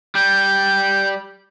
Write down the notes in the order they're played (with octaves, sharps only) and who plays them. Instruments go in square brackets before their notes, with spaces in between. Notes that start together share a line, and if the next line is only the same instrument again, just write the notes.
[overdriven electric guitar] G3 [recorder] G6